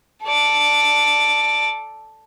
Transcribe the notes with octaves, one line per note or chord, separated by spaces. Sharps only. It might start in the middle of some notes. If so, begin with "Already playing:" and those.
A4 D5